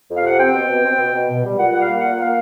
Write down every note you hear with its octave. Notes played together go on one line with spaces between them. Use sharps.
F2
F5
C3 F#5
C4 G5
B2
B2
C4
B2
B2
B2
G3
A#2 F#5
G3 F#5
F5
A#3
A#2 F#5
A#3 F5